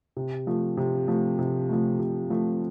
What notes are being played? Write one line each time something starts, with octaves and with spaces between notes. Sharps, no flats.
C3
F3 A3
C3
F3 A3
C3
F3 A3
C3
F3 A3